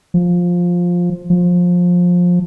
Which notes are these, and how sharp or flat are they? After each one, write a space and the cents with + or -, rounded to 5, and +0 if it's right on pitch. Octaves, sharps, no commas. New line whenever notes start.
F3 +10
F3 +20